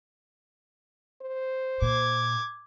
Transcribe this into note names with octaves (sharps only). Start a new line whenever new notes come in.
C5
A#2 D6 G#6